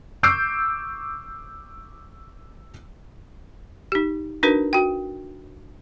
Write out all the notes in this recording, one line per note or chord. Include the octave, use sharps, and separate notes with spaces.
C#6 D6 E6 G6 C7 D7
D#4 G4
D4 D#4 F#4 A#4 B4
F#4 G5